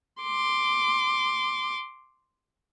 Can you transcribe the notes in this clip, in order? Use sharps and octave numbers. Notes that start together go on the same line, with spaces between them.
C6 D6